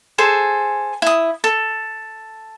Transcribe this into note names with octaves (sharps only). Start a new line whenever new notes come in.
G#4 A4 C5
E4 D#6
A4